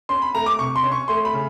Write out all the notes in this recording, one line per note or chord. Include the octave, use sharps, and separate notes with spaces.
C#4 C6
B5
A3 A#5
D6
C3 C#6
C6
C#4
C#6
A3 C6
B5
C#3